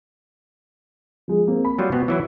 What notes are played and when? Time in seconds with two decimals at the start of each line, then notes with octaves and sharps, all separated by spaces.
1.28 F3 G#3
1.47 A#3 C4
1.65 B5
1.78 F#3 G3 F4
1.92 B2 B3 C4
2.08 E3 F#3 E4